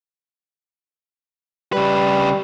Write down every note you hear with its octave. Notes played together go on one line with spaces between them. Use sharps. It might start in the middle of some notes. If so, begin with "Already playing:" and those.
C#3 G3 B4